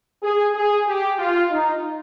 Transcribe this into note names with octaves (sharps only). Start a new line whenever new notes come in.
G#4
G#4
G4
F4
D#4